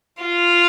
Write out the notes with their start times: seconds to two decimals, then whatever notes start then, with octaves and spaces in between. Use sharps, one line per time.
0.23 F4